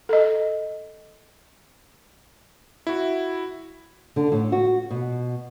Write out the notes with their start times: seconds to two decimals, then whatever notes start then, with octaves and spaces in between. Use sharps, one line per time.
0.09 A4 D#5
2.87 E4 F#4
4.16 D3
4.32 A2
4.52 F#4
4.90 B2